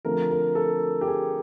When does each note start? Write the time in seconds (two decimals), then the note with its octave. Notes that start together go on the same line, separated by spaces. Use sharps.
0.05 D3 F3 A3 C4 A#4
0.31 A#4
0.55 A4
1.01 G4
1.07 G#4